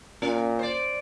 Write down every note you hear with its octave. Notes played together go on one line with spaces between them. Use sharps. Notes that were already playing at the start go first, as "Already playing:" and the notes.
A#2 C#4
C5 D5